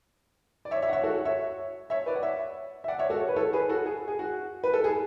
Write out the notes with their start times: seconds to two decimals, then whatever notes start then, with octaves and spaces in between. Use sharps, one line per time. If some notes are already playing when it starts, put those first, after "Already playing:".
0.65 D5
0.71 C#5 E5
0.82 C#5 E5
0.89 F#5
0.93 C#5 E5
1.04 F#4 A4
1.14 F#4
1.25 C#5 E5
1.90 C#5 E5
2.06 B4 D5
2.15 F#5
2.23 C#5 E5
2.84 E5
2.88 D5 F#5
2.99 C#5 E5
3.10 F#4 A4
3.20 C#5
3.28 B4
3.36 A4 C#5
3.53 G#4 B4
3.69 F#4 A4
3.86 G#4
4.08 G#4
4.19 F#4
4.64 B4
4.74 A4
4.84 G#4